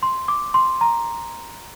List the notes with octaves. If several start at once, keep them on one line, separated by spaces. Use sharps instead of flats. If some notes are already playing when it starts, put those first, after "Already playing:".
C6
D6
C6
A#5